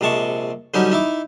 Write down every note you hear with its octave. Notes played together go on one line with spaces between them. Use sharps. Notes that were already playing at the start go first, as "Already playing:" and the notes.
A#1 C3 G#3 A5 C#6
D3 F#3 G3 C#4 D#4 G4
D#4 E4 D6